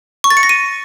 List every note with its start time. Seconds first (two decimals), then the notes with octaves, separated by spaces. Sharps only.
0.24 C#6
0.30 A6
0.37 C#7
0.43 A#6
0.49 D#7